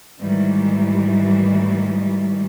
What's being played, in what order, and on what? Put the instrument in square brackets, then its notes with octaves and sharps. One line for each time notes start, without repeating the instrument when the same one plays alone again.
[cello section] G#2 D#3 E3 F#3 G3 A3